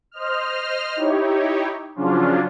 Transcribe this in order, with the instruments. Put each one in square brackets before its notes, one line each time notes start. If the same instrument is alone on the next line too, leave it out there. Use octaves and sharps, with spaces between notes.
[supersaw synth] C5 D#5 F6
D#4 E4 G4 C#5
C#3 F3 F#3 C#4 D4 F4